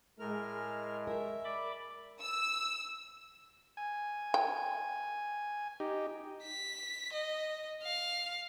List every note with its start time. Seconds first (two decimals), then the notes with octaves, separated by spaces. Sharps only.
0.19 A2 G#3 A#4 F6
1.07 A#4 E5
1.45 D5 B5 D6
2.20 E6
3.77 G#5
4.34 G5
5.80 D#4 G4
6.43 B6
7.13 D#5
7.83 F5